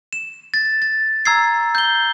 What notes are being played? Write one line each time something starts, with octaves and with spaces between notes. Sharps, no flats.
E7
A6
A6
A#5 E6 G#6 C7
G6 G7